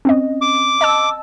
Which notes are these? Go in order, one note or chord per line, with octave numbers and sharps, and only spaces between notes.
C4 C#4 D#5
D6
D#5 A5 E6